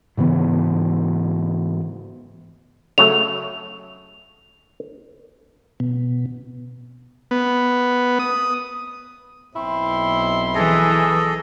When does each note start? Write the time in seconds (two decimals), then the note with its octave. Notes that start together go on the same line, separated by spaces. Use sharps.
0.17 G#2 C#3 E3 B3
2.98 C#3 F#3 A3 F7
5.80 B2
7.31 B3
8.19 D#6
9.56 B1 C4 E4 C6
10.55 E3 G#4 A4 D#5